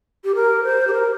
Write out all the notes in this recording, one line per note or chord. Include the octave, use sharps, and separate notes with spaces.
G4
A#4
C5
G4
A#4